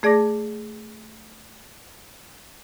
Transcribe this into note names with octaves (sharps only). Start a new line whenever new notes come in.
A3 G#4 D5 A5 D6 A#6